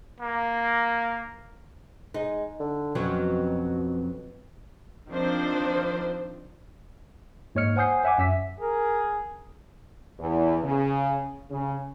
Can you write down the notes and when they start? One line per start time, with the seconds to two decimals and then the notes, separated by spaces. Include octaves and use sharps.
0.20 A#3
2.14 G#3 D#4
2.59 D3
2.95 F2 B2 F#3 C#4
5.10 D#3 F3 C4 D4 C5
7.55 G#2 A#3 C#5 D#5 F6 C#7
7.76 C5 F#5 G#5 D#6 G6 C7
8.04 C#5 E5 F#5 G#5 D6
8.18 F#2 E5 B6
8.60 G#4 A#4
10.20 E2
10.64 C#3
11.50 C#3